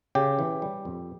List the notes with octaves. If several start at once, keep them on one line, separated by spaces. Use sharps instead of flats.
C#3 G4
E3
G3
F2